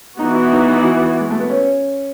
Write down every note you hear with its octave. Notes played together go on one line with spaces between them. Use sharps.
E3 B3 D#4 F#4
E4
D#4
D#4
E4
G#3
A3
B3
C#4